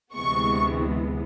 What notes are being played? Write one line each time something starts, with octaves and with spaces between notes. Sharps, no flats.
D2 C3 E3 G#3 B3 C#6